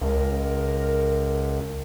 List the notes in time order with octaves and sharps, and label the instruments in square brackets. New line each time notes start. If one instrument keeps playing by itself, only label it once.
[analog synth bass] C#2 [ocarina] A#4